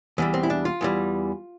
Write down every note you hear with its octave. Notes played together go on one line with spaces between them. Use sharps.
E2 E3 G3
C4
E4
D4
F4
E2 E3 G3